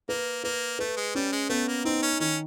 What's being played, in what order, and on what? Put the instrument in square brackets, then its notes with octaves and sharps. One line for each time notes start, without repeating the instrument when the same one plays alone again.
[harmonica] A#3 [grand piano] B4
[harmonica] A#3 [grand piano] B4
[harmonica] A3 [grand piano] B4
[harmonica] G#3
[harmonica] G3 [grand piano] C#4
[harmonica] G#3
[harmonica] A3 [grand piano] B3
[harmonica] A#3
[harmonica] C4 [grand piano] D#4
[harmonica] C#4
[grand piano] D#3 [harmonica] C#4